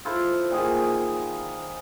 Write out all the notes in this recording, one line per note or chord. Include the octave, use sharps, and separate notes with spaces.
E4 F4 A4 C5
A#2 D#3 G#4 C#6